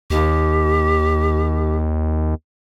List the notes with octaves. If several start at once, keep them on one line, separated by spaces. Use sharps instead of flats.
D#2 G4